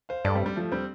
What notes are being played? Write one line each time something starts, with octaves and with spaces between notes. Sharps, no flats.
C5 F5
G2 A4 D5
G3 C4
G3
F3 A3
G3 C4